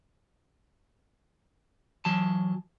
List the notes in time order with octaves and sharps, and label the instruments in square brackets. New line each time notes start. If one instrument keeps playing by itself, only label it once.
[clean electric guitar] E3 F#3 A5